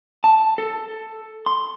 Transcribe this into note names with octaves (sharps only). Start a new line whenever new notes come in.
A5
A4
C6